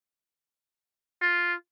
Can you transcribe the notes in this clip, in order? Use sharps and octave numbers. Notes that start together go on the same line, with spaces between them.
F4